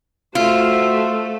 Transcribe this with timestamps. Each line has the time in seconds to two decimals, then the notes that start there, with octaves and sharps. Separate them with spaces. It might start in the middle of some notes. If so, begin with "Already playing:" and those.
0.35 A3 F4 F#4 C5 E5